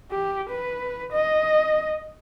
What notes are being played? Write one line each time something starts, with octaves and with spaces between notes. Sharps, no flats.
G4
B4
D#5